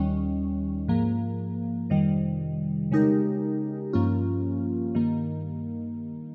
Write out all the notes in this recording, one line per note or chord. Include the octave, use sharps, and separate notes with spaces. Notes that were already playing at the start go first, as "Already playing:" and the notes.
Already playing: D#2 D#3 G3 C#4
G#2 F3 A#3
F2 C3 D#3 G3
C#3 G#3 D#4 G4 A#4
G2 F3 A#3 C#4 F4
G2 D#3 A#3